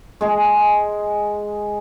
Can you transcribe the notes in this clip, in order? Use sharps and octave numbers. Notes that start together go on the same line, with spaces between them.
G#3 G#4